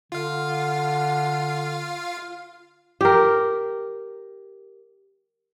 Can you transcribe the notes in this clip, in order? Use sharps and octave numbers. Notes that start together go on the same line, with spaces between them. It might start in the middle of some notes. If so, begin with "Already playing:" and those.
D3 F4 F5
G4 A#4